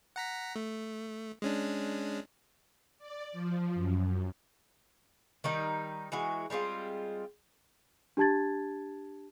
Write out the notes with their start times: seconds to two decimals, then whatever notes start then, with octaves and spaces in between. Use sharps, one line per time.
0.16 F#5 A#5 B6
0.56 A3
1.42 G#3 C#4 D4
2.98 D5
3.32 F3
3.74 F#2
5.44 D#3 G3 D#4
6.12 E3 G#3 F#4
6.50 G3 G#3 C4 F4
8.17 D4 G4 A5 G#6 A6